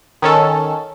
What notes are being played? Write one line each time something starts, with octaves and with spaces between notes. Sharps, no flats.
D#3 C#4 A4